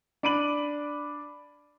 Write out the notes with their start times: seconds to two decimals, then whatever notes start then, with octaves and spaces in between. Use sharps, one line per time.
0.23 D4 B5 D7 D#7 F#7